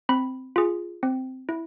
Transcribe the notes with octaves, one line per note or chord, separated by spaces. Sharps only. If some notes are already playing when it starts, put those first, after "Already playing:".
C4 B5
F4 G#4
C4
E4